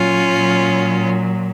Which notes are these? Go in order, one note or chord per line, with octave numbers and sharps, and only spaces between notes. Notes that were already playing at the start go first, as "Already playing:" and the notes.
Already playing: A#2 F#3 C#4 F4
A#2 F#3